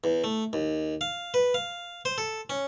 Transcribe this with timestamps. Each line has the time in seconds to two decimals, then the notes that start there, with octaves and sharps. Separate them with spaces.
0.04 E2
0.24 A3
0.53 D#2
1.01 F5
1.34 B4
1.54 F5
2.05 C5
2.18 A4
2.50 C#4